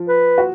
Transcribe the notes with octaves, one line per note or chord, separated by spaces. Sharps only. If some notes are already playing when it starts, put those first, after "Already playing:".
Already playing: F3 F4
B4
F#4